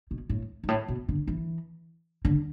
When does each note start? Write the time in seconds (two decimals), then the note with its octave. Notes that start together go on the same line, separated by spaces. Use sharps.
0.11 B2
0.29 A2
0.63 G#2
0.68 A2
0.88 B2
1.09 D3
1.27 E3
2.25 D3